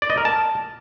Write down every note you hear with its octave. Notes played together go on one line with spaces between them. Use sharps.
D5
D#5
A#4
A5